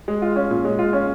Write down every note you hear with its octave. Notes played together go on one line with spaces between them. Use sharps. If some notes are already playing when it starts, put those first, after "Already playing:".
G#3
F4
C#4
A#2
G#3
F4
C#4